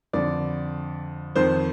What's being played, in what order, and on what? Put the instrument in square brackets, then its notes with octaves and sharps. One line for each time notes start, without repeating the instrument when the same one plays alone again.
[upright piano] F2 D3 D5
F2 D#3 C5